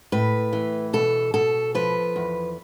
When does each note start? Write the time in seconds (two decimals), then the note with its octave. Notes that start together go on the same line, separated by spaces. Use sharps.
0.12 A2 B4
0.53 E3
0.93 B2 A4
1.34 B2 A4
1.75 F3 B4
2.16 E2